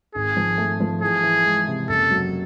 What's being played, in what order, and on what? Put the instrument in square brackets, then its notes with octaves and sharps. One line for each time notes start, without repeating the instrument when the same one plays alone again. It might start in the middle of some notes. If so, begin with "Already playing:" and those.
[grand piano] G#1 [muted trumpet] G#4
[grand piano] F3
A3
F3
[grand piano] E3 [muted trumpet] G#4
[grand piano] E3
G#3
C3
[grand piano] F#1 [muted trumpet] A4
[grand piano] F#3